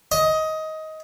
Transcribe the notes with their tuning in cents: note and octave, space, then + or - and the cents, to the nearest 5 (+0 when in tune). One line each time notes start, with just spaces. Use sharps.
D#5 +15